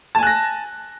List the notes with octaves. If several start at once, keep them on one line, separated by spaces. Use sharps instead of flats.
G#5 A5 F#6 A#6